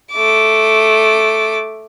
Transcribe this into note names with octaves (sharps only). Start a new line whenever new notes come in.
A3 D6